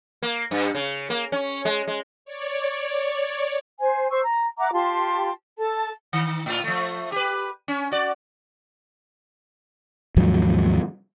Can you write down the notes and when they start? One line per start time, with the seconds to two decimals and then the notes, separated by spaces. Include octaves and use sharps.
0.23 A#3
0.51 G2
0.75 C#3
1.10 A#3
1.32 C#4
1.65 G#3
1.87 G#3
2.25 C#5 D5
3.80 C5 G#5
4.11 C5 C#6 E6
4.23 A#5
4.58 E5 F#5 A#5 D6
4.72 F4 G4 A5 C6
5.58 A4 A5
6.13 D#3
6.46 A2 F4
6.64 F3 A3
7.12 G4 B4
7.68 C#4
7.92 F#4 D5
10.16 D#2 G#2 F3 F#3